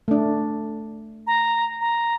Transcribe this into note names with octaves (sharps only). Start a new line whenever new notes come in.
A3 D4
A#5
A#5